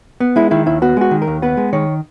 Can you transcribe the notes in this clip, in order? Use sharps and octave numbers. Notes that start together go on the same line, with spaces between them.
B3
G#3 E4
D#3 E4
D#2 E4
B3 F#4
G#3 F#4
D#3
A#4
D#2
B3 B4
G#3
D#3 C#5